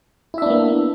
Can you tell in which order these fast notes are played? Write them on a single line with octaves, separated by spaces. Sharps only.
E4 E5 D4 B3 A#3